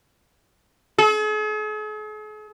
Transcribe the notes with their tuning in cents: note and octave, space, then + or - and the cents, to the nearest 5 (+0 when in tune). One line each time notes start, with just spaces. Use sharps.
G#4 +45